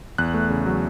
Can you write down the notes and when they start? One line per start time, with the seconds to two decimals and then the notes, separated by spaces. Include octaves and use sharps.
0.18 E2 F#6
0.34 A3
0.50 C#3
0.66 F#3